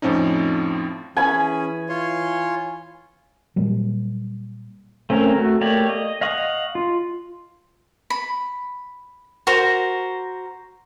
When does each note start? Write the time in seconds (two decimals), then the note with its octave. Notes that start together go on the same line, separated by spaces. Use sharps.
0.02 F2 A2 F3 C4 C#4 D#4
1.16 E3 C#4 G#4 G#5 B5
1.89 F4 C#5 C6
3.56 A#2 F#3 G3 A#3
5.10 A3 C4 C#4 A#4
5.36 A3 F#4
5.61 A3 A#3 G4 C#5 D5
5.89 D#5
6.21 D#5 F5 F#5 C#6 D#6
6.75 F4
8.10 B5
9.47 F#4 A#4 C5